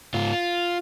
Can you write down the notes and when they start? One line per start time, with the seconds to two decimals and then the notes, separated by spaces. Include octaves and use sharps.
0.14 G#2 F4